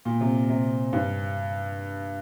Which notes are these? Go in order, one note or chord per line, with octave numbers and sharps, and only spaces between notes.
A#2
C3
C3
G2